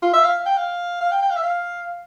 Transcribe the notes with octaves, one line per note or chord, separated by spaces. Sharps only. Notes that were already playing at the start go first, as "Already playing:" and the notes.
F4
E5
F5
G5
F5
F5
G5
G5
F5
E5
F5